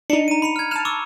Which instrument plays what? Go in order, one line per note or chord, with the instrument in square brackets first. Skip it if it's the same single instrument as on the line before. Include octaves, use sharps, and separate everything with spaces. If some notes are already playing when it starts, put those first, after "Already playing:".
[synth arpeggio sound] D4 D#4 [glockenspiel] C#7
[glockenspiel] A#5 D#7
B5 C#7 F7
F6 G#6
[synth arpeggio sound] A5 F6 [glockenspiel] E7 F7
[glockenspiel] C#6 D6 E6